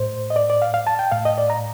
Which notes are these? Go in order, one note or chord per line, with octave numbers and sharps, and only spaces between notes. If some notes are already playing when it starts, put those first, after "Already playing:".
Already playing: A2 C5
D#5
D5
D5
F5
F5
A5
G5
A2 F5
D#5
D5
A#5